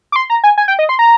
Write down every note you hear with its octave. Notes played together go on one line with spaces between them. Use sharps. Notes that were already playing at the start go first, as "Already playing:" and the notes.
D6
C6
A#5
G#5
G#5
G5
D#5
C6
A#5